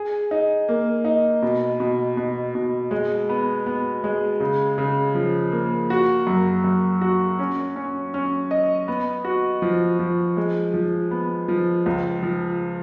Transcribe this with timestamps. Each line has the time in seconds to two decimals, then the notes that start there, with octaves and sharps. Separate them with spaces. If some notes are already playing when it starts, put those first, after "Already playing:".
Already playing: G#4
0.31 D#4
0.69 A#3
1.05 D#4
1.42 B2
1.80 B2
2.17 B2
2.55 B2
2.91 G#3
3.29 B3
3.66 B3
4.04 G#3
4.40 C#3
4.78 C#3
5.15 F3
5.52 A#3
5.90 F#4
6.27 F#2
6.64 F#2
7.01 F#4
7.39 C#4
7.76 C#4
8.14 C#4
8.51 D#5
8.88 B3
9.25 F#4
9.62 F3
9.99 F3
10.37 G#3
10.74 F3
11.11 B3
11.48 F3
11.86 C#2
12.23 F3